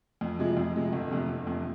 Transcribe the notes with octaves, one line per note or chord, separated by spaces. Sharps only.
F2
C3 F3 G#3
F2
C3 F3 G#3
G1
F2 C3
G1
F2 C3